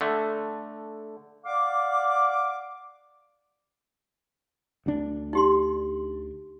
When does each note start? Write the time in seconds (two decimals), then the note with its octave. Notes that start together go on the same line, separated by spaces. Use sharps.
0.01 D3 A3
1.45 D5 F5 F#5 D6
4.86 D2 D4
5.33 D#4 G4 C6